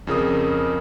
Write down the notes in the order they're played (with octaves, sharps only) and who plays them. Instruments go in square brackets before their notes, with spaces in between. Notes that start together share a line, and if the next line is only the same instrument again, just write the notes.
[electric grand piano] F2 C#3 A#4 D#6